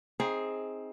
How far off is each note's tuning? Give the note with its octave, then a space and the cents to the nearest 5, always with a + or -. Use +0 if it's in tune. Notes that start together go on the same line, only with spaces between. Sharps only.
C4 +10 D#4 +25 G#4 +0